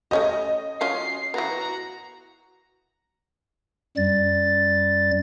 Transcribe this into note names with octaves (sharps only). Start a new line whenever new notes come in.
A3 C#4 G4 D#5
F#3 C#4 F4 C7
E3 B3 F#4 A#5
F#2 G3 A6